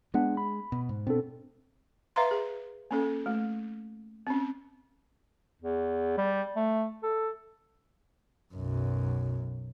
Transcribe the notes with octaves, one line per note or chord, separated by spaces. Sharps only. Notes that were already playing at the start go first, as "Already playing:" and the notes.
G#3 B3 D4 F#5
B5
B2
G#2
B2 C4 D4 A4
B4 E5 F5 A#5 C6
G#4
A#3 C#4 A4
A3
C4 C#4
E2
G3
A3
A4
B1 F#2